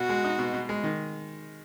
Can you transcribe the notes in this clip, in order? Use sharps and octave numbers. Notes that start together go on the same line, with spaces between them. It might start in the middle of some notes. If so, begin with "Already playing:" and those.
Already playing: B2 F#4
G#3
D#4
B2
B2
G#3
D#3